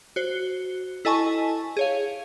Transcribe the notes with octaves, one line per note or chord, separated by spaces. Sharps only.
F#4 C5
E4 A4 D#5 G#5 A5 C#6
G#4 C#5 F5